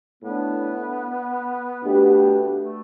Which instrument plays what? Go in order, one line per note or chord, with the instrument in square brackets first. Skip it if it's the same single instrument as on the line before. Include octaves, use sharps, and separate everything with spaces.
[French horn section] A2 A3 D4 [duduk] B3
[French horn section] B2 A3 D4 G4 B4
[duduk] A3